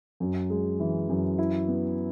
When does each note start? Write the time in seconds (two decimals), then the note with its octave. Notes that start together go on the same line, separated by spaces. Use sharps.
0.20 F#2
0.50 G#3
0.80 E3
1.09 F#2
1.38 E4
1.68 B3